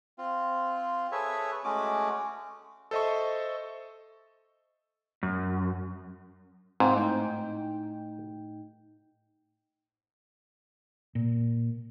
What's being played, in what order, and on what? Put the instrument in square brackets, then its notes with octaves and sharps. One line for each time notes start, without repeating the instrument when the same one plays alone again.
[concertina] C4 F4
G#4 A4 B4 C#5 E5
G#3 A3 C#4 F#4 D6
[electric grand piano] A4 C5 D#5 E5 C#6
[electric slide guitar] F#2
[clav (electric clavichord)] G#2 [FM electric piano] C4 F4
[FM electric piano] A2 D#4 G5
[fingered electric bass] A#2